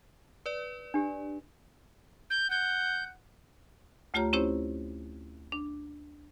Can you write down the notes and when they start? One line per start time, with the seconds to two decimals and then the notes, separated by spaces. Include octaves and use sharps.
0.46 B4 D5
0.94 D4 G4
2.30 G6
2.50 F#5 G6
4.14 D2 A3 F4 G4 C#5 A#5
4.33 C4 C#4 E4 G4 C5 C#5
5.52 D4